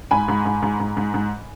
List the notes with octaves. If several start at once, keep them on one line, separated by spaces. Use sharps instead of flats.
G#2 G#5 B5
G#2
G#2
G#2
G#2
G#2
G#2